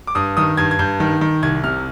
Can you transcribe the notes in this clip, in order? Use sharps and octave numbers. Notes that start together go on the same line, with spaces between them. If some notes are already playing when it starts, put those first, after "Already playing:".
D6
G2 D#6
D#3 D#6
G2 G#6
G#6
G2 G6
D#3
D#3
C2 G#6
C3 F6